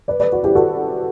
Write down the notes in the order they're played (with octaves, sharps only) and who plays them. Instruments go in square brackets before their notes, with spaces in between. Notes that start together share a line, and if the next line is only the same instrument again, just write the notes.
[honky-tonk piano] B4 D5
B4 D5
F#4
E4 G4
F#4 A4